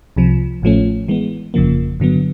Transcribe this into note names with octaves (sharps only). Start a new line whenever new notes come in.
C2 C3 F3
A1 A2 F3 A3 C#4
E3 G#3 B3
G1 F2 C#3 F3 A#3
G2 D3 F#3 B3